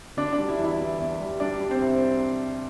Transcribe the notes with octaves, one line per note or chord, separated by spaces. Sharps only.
D3 D4 D5
D4 D5
G3
E4 E5
E2
E4 E5
E2
E2
G3
G3 D4 D5
G3
C4 C5
C2